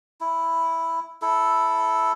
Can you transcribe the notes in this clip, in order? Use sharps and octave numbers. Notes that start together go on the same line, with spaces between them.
E4
E4 A4